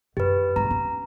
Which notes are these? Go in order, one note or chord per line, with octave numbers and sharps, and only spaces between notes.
F#2 G4 B4
G2 G#3 A#5
C#4